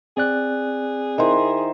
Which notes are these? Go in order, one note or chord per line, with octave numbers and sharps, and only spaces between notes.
C4 G#4 D5 F#6
D#3 E4 C5